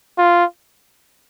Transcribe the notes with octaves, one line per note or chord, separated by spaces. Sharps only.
F4